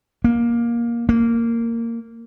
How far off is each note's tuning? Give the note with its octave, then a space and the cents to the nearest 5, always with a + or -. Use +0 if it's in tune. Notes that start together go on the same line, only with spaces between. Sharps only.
A#3 +15
A#3 -15